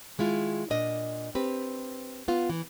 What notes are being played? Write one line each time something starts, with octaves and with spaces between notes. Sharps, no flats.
D#3 G#3 E4 F4
A#2 D4 D#5
C4 G4 B4
B3 F4
E3